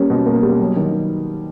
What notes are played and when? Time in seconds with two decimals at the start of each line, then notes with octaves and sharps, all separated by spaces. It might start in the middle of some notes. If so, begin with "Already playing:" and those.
Already playing: G3 A#3 C#4
0.10 B2
0.26 A#3
0.43 G3
0.59 F#3
0.76 D#3